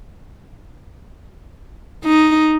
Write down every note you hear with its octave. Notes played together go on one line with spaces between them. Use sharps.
D#4